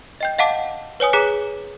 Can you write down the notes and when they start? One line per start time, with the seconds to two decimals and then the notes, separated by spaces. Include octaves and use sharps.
0.21 D#5 G5 G6
0.39 D#5 F5 F#5 A5 D6
1.00 B4 C#5 G#5 D#6
1.13 G#4 A#5 D6 F#6 B6 C#7